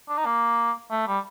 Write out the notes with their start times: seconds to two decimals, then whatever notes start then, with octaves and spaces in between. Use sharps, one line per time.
0.09 D4
0.18 D#4
0.25 A#3
0.91 A3
1.07 G3